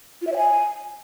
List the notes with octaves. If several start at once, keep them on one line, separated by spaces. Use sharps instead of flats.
F4
E5
C#5
G#5